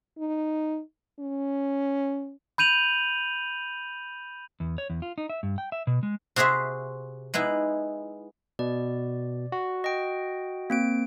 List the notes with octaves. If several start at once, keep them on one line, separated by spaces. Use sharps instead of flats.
D#4
C#4
B5 G6 D#7 F7 F#7
E2
C#5
E2
F4
D#4
E5
G2
G5
E5
B2
G#3
C3 F#4 G#4 C5 E5
G#3 B3 D#4 E4
B2 D5
F#4
D#5 G5
A#3 C4 D7